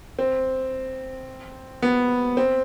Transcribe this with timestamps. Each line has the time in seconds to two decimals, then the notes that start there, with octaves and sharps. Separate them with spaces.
0.19 C4
1.82 B3
2.37 C4